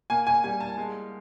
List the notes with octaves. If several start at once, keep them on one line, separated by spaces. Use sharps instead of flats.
A#3 G#5
G#5
G3 G#5
A5
G#3